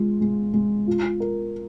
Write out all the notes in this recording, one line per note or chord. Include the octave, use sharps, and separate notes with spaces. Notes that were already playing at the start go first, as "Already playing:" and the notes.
Already playing: G#3 F4
G#3
G#3
F4
A#4